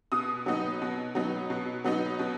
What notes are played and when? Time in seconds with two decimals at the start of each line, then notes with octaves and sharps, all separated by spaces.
0.12 B2 D#6
0.46 F#3 B3 D#4
0.82 B2
1.15 F#3 B3 D#4
1.50 B2
1.84 F#3 B3 D#4
2.19 B2